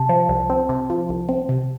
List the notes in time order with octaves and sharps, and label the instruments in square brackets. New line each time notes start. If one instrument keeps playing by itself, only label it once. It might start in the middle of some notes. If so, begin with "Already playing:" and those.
Already playing: [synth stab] C3 [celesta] A5
[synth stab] F3
C2
C4
C3
F3
C2
C4
C3